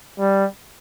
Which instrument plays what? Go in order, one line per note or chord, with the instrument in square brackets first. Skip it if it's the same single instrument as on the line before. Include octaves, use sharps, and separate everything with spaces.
[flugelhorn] G3